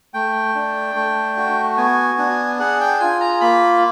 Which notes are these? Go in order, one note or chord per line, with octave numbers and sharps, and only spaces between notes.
A3 G5
D4
A3
F#4
B3 G#5
D4
G#4 F#5
G5
F4 G#5
A#5
A#3 B5